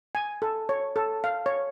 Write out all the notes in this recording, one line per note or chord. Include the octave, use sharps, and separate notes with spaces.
G#5
A4
C#5
A4
F5
C#5